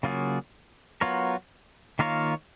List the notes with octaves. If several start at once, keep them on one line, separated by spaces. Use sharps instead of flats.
C#3 F#3 A#3 F4 G#4
F#3 B3 F4 A#4 C#5
D#3 A#3 F4 A#4 C#5